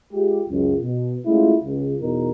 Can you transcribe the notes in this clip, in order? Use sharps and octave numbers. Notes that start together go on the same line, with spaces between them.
G#3 F4 G4
C#2 F#2
B2
G#3 A3 C#4 E4 F4
C#2
E2 B2 D#4 A#4